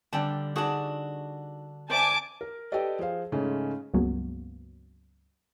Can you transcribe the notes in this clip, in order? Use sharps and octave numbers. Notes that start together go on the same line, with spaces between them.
D3 G3 D4 G5 A5
D4 D#4 F#4 G#4 A5
C5 D5 E5 G#5 A5 D6
A#4
G4 A4 B4 D5 D#5
F3 G#4 C5 F5
G#2 C#3 G#3 A3 C#4
C#2 G2 F#3 G#3 A#3 B3